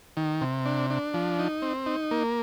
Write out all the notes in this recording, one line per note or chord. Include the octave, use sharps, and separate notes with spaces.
D#3
C3
D4
D4
F3
D#4
C4
D#4
A#3